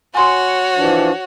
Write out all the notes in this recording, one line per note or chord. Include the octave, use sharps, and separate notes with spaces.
F#4 C#5 G#5 C6
E3 F3 D4